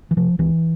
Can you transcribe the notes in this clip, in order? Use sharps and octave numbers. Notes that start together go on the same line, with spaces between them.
E3
C3 F3
C#2 E3